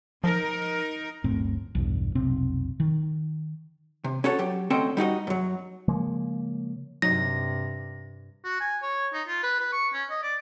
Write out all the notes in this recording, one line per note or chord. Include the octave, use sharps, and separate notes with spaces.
F3 D#4 A#4
D1 G1 A2 C4
B1 E2 G2
F1 B1 C3 C4
D#3
C3
C#4 F#4 A4 C#5 A5
F#3 G4
D2 C4 C#4 A4 D#5 G5
G3 D#4 F#4 D#5
F#2 F#3
C#3 F3 G#3 A#3
G2 C3 F#3 D#4 A#6
F#4
G#5
C#5
D#4
F4
B4
B4
C#6
C#4
D#5
D5